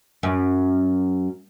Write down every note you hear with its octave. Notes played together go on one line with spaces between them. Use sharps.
F#2